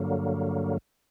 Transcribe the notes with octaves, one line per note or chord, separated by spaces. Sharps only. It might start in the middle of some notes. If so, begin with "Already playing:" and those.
Already playing: G2 D3 F#3 A#3